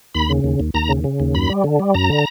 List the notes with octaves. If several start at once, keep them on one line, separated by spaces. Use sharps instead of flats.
D#2 B5
C#3
D#2
D#2
D#2 A#5
C#3
C#3
D#2
F#2 B5
G3
D3
G3
F#2 A#5
D3